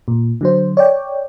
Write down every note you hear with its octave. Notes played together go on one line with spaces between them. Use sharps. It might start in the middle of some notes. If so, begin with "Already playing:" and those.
A#2
D3 F#3 C5
C#5 D5 G5